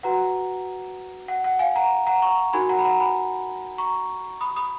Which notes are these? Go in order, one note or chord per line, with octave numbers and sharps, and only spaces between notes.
F#4 B4 F#5 A#5
F#5
F#5
F5 G#5
F#5 A#5
F#5 A#5
A#5 C#6
D#4 F#4 A#4 G#5 B5
F#5 A#5
B5
F#5 A#5
G#5 B5
A#5 C#6
B5 D#6
B5 D#6